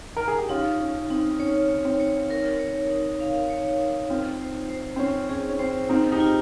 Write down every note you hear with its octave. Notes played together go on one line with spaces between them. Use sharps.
A#4
G#4
G4
C#4 D#4 F4
C#4 D#4
C4 D#4
C#4 C#5
C#5
C4
C#5
A#4
C#5
D#4
F5
C#5
D#4
C4 F4
C5
C5
C4
C#4 C5
C#4 G#4
C#4
C4 C5
C4 D#4 F4
D#4 G4
F4